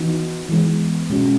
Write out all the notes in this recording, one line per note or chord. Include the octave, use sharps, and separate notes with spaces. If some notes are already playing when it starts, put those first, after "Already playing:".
Already playing: E3 B3 D#4 F#4
E3 G#3 B3
B2 G#3 C#4 F#4